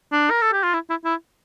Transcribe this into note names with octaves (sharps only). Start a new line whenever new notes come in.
D4
A#4
A4
G4
F4
E4
E4
E4